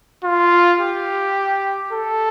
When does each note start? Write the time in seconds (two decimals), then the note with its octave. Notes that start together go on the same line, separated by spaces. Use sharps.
0.24 F4
0.80 G4
1.92 A4